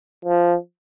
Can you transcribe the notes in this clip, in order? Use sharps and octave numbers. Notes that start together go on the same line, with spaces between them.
F3